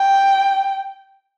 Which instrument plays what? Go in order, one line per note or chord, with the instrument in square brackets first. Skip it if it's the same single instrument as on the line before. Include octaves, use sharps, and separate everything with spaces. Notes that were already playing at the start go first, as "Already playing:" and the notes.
Already playing: [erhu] G5